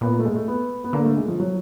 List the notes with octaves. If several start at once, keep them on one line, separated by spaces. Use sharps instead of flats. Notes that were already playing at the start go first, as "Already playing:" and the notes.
A#2 B3
A#3
A3
G#3
A3
B3
B3
D3 A#3
A3
G#3
F3
F#3